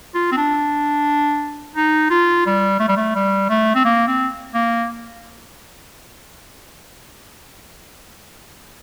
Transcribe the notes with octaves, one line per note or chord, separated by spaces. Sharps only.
F4
C4
D4
D#4
F4
G3
A3
G3
A3
G3
A3
C4
A#3
C4
A#3